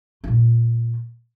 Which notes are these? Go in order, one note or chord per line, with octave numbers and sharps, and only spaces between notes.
A#2 F4